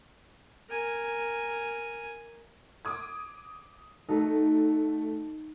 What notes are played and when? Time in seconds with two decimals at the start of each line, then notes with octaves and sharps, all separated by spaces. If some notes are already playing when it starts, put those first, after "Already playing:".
0.70 A#4 G#5
2.85 D6 D#6 G#6
4.09 A3 D#4 F#4 A4